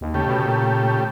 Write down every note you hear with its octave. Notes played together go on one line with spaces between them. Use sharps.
D#2
C#3 A3 G4
B2
A#2